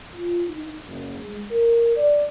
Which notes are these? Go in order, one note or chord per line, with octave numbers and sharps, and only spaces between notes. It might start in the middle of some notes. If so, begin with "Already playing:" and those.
F4
D#4
F#1
G#3
A#4
D5